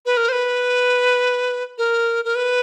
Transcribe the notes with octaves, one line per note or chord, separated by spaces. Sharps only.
B4
A#4
C5
B4
A#4
A#4
B4